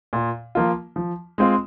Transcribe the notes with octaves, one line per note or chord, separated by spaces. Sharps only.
A#2
F3 A#3 F4
F3
G#3 C4 F4